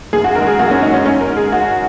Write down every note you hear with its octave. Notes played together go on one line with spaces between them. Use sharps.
F#2 G#4
F#4
D#3 G#3 A#4
G#4
F#2 F#4
C#4
D#3 G#3 D#4
C#4
G#2 C#4
A#4
G#3
G#4
G#2 F#4